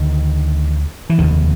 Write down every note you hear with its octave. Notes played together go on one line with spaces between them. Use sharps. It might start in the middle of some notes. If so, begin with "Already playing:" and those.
Already playing: D2 D3 D#3
E3
F1 D#2 D3 D#3